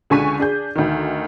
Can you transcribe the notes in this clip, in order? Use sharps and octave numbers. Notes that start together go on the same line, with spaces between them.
C#2 D3 G#5 C#6 B6 D#7
D4 G#4 G6
D2 D#3